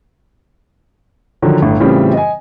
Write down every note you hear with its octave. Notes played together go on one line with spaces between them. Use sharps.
D3 D#3 F3 F#3
G1 A2
A2 C#3 E3 G3 C4 F4
D#5 G#5